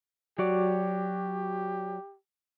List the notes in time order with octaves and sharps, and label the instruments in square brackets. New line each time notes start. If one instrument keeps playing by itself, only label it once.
[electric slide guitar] F#3 F#4 D5 [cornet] G4